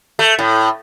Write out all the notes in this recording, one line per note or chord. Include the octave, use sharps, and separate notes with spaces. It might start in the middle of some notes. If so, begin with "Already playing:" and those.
A3
A2